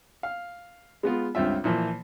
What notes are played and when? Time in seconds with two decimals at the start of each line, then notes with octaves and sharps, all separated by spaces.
0.23 F5
1.03 G#3 B3 F4
1.35 C#2 G2 C4 F4 E5
1.64 A#2 E3 F3 A#3